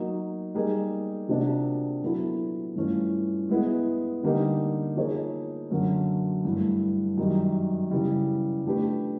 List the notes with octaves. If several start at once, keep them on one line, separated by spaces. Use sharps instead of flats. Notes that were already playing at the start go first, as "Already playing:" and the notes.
Already playing: F#3 A#3 D#4
G3 A#3 D#4 G#4
C3 F3 A#3 D4 F#4
A#2 F#3 B3 E4 A4
G2 E3 A3 C#4 F4
G#3 B3 E4 G#4
D3 G3 A#3 D#4 G4
F3 A#3 D#4 G#4 C#5
F#2 D3 F#3 A#3 C#4
G2 E3 A3
F#2 D#3 G3
C#3 E3 G3
F3 A3 D4 G4 B4